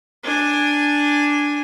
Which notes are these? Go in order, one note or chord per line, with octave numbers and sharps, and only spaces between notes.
D4 G#5